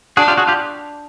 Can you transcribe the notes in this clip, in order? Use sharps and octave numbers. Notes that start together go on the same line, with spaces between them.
D4 F#4 G#4
F4 G4
F#4 G#4
F4 G4